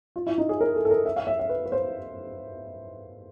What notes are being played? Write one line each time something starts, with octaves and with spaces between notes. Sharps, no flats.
F4
E4
D#4
G#4
A#4
A4
A4
A#4
E5
F5
E5
E5
B4
B4
C5